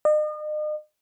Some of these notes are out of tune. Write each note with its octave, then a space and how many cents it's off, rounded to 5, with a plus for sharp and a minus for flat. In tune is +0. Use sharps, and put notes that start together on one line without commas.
D#5 -40